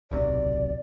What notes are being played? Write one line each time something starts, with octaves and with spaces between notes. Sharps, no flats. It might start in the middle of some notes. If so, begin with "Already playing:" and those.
D1 B1 C3 D5